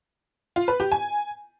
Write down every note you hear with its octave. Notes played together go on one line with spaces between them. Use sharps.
F4
B4
G4
G#5